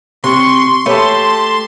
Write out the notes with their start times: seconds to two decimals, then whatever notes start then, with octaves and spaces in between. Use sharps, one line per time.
0.24 C3 C6 C#6
0.86 A3 G4 B4 C#5 A5